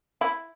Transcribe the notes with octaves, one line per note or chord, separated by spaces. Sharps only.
E4